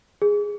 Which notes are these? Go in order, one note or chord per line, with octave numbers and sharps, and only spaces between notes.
G#4